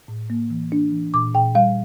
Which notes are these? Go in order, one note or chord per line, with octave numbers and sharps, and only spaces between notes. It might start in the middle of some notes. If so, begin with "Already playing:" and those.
A2
A#3
E3
D4
E3
A#2 D6
A#2 G5
G3 F5